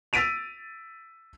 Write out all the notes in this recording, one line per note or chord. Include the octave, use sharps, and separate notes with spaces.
E6 A6 B6 D7 D#7 F7